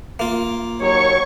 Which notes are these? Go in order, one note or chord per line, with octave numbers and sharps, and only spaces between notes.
A#3 F4
D#2 F#3 C#5 C#6